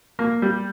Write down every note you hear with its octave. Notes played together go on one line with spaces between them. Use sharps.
A#3
G3